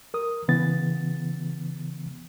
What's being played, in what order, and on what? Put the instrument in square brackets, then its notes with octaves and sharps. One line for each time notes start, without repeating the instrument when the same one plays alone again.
[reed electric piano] A#4 D#6
C#3 E3 B3 A6